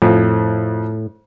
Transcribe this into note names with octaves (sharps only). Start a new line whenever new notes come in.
F2 A2